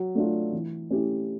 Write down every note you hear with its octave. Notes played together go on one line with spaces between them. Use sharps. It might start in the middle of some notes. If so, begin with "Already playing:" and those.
Already playing: F#3
A3 D4 F4
E3
A3 C#4 E4 G4